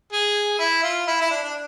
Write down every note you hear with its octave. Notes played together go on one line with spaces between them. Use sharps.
G#4
E4
F4
E4
E4
D4
D4